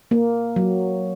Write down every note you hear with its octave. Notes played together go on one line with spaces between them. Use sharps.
A#3
F#3